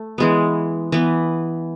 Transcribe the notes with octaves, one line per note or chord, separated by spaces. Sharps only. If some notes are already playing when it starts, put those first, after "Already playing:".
Already playing: A3
E3 G#3 B3
E3 B3